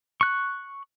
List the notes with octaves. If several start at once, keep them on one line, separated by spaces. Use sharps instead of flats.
C#6 F#6